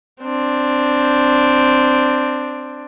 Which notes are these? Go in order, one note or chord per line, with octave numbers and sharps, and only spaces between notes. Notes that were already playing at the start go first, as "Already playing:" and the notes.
C4 D4